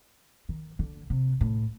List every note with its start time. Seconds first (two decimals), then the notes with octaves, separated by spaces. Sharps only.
0.49 D#3
0.79 D3
1.10 C3
1.41 A2